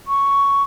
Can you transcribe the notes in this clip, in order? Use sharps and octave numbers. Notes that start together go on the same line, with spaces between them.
C#6